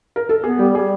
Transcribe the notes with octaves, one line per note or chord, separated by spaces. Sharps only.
A#4
A4
B3 G#4
G3 G4
G3 G#4